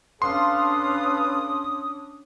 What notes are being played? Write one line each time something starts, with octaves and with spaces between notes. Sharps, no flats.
C#4 D4 A4 B4 F5 C6 D#6